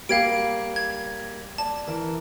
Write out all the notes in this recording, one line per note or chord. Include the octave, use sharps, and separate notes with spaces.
G3 A#3 G4 F5 G#6 D7
G#6
D5 A5
E3 A#4